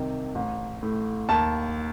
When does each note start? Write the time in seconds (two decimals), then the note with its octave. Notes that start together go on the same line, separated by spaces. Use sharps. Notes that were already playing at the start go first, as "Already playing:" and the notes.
Already playing: C2 C3 D#3
0.35 A1
0.83 A2
1.29 D#2 A5